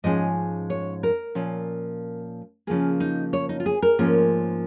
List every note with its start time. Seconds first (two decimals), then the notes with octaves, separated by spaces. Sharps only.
0.04 G#2 F3 G#3 C#4 D#5
0.70 C#5
1.03 A#4
1.35 A#2 F3 C#4
2.67 C#3 F3 A#3 G#4
3.00 D#4
3.33 C#5
3.49 D#4
3.60 F4
3.66 G#4
3.82 A#4
3.99 G#2 F3 A#3 C#4